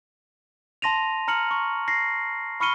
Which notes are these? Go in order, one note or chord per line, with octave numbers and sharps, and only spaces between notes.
A5 C6 A#6 D#7 F7
A#5 F6 C#7 F#7
C#6
A#6 C7
B5 C#6 F6 C#7 D#7 G7